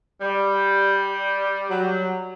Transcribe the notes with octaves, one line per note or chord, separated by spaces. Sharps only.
G3
F#3